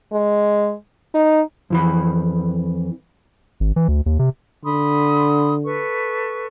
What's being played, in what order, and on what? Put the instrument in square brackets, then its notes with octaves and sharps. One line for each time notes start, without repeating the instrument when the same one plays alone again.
[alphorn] G#3
D#4
[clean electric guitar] F2 E3 B5
[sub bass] G#1
E3
D2
D#2
C3
[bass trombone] D3 [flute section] B5 C6 D#6
[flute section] A4 B4 C#6